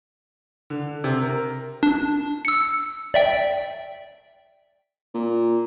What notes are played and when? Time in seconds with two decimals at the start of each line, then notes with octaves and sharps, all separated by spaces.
0.70 D3
1.04 C3
1.22 A#4
1.83 D4
2.45 E6 C#7
3.14 D5 E5 G5
5.15 A#2